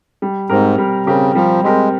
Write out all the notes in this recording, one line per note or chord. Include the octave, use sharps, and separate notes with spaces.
G3
G#2 C4 G4 A#4
G3
C#3 C4 G4 A#4
F3 G3
G#3 C4 G4 A#4